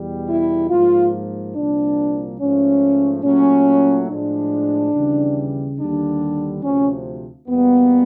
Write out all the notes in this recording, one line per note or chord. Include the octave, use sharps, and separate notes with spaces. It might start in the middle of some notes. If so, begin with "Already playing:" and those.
Already playing: E2 B2 G3
E4
G#2 F3 A#3 F4
C2 A#2 F3 A#3 D4
G#2 F3 A3 C#4
A#2 F#3 A3 C#4
A2 F3 G#3 D4
D#2 C#3 E3 G3
D#2 D3 G3 D4
D2 C3 F3 C#4
E2 B2 G3 A#3 B3